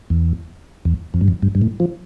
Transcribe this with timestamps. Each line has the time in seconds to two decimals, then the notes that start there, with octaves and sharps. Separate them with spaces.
0.10 E2
0.85 E2
1.14 F2
1.21 G2
1.28 F2
1.42 G2
1.55 G2
1.62 A2
1.80 F3